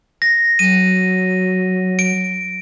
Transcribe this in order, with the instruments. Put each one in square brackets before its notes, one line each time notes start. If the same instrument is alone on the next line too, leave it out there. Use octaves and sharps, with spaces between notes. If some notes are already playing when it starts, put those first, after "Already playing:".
[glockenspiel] A#6
[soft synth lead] F#3 [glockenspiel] D#7
[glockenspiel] D7